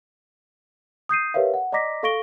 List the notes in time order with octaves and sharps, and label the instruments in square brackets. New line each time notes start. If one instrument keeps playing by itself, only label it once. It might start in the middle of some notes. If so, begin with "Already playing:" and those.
[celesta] D#6 G6 C7 D#7
G4 A#4 B4 C#5 E5 F5
F#5
D5 D#5 A#5 D6 A#6 B6
A4 F5 C#6 A#6 D7 G7